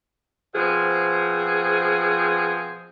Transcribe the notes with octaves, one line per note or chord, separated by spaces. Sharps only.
B2 F3 C4 G#4